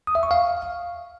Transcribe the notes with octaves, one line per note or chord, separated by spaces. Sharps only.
D#6
E5
C#6
F5